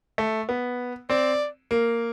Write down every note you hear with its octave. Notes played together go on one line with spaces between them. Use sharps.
A3
B3
C4 D5
A#3